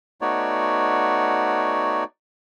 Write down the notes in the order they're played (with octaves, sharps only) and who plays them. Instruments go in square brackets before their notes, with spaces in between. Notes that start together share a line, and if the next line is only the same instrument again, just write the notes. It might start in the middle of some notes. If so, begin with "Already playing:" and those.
[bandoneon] A3 B3 D#4 F#4 C#5 D5